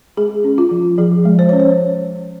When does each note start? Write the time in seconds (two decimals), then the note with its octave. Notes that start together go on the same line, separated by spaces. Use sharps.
0.17 G#3 G#4
0.44 C#4
0.58 F4
0.71 F3
0.98 F3 G#4
1.25 G#3
1.39 C5
1.49 C#4 C#5
1.60 C5